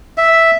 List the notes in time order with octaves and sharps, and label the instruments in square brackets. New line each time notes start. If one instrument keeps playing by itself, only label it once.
[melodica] E5